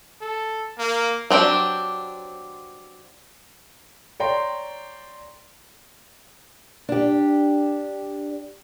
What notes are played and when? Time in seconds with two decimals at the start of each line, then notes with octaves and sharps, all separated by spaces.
0.22 A4
0.79 A#3
1.30 F#3 C4 D4 G4
4.20 C#5 D5 G5 A#5 C6
6.89 D4 G4